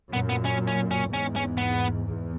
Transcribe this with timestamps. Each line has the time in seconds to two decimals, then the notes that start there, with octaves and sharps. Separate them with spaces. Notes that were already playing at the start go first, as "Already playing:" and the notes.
0.12 F#2 A#2 B3
0.29 B3
0.45 C#4
0.68 C#4
0.91 C#4
1.09 E2 G#2 C#4
1.36 C#4
1.58 B3
2.05 E2